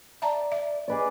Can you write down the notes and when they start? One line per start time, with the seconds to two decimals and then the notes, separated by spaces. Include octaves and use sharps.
0.22 D5 E5 A5 A#5
0.52 E5
0.88 G#4 B4 D5 D#5